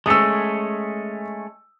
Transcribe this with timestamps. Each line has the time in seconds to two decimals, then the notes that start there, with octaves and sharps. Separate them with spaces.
0.06 G#3 A3 C#4 D#6 E6